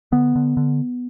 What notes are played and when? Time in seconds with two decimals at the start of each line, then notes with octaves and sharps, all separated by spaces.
0.12 D3 B3
0.36 D3
0.57 D3